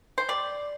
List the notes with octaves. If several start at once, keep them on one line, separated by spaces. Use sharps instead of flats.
C5
G3 D5